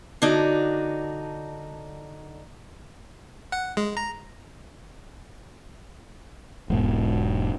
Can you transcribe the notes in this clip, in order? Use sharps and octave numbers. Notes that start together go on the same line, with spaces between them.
D3 D4 D#4 F#4
F#5
G#3
A#5
E1 G#2